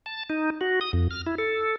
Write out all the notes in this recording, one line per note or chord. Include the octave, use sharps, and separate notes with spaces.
A5
D#4
F#4
D#6
F2
F6
E4
A4